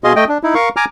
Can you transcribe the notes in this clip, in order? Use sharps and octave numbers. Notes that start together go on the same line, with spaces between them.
B2 G#4 D#5 F5 C6
A3 D#5 G5
D4
D#4 E4
A#4 F5 C#6
G#5 A#5 D6 F6